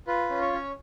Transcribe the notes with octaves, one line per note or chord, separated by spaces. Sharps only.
F4 B4
C#4
C#5
C#4